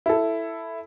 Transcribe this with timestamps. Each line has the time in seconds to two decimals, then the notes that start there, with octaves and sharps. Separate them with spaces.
0.06 E4 A4